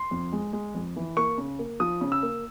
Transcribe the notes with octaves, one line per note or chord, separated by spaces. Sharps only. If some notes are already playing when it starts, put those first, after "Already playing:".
Already playing: C6
F2
G#3
G#3
F2
E3
A#3 C#6
C#3
A#3
F3 D#6
C#3
E6
A#3